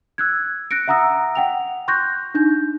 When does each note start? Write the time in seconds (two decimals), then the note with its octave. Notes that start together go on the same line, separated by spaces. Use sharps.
0.18 E6 F#6 G#6
0.71 F#6 A#6 C#7 D7
0.88 E5 F#5 A#5 D#6 E6 A#6
1.35 F#5 G5 F7
1.88 C6 C#6 F#6 G6 A#6
2.34 D4 D#4 G6